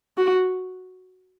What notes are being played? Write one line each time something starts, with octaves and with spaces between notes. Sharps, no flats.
F#4